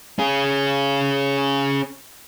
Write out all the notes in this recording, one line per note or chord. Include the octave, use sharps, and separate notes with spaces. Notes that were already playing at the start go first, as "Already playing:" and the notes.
C#4 G#4